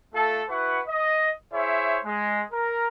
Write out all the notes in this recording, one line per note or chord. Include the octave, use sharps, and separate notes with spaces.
A3 F4 A4
E4 F#4 B4 F#5 C#6
D#5
E4 G#4 C5 C#5 E5
G#3
A#4